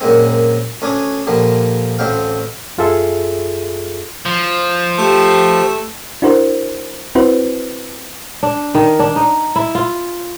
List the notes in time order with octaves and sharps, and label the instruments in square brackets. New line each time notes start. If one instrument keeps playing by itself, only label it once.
[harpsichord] F#2 A#2 G#3 C4
D2 C#4 D4 G#5 D6 D#6
A#2 D3 F3 G3
A1 D2 D3 C4 C5 F5
[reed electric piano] F#2 F4 G#4 A4 E5
[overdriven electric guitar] F3
[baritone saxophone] A3 [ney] G4
[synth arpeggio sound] D4 E4 F#4 A#4 C5
C4 E4 F#4 B4 C5
[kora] D4
D#3
D4
D#4
E4
F4